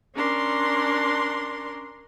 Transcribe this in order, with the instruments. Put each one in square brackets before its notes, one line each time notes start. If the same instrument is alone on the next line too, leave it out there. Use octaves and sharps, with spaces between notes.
[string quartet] C#4 D4 A#4 C6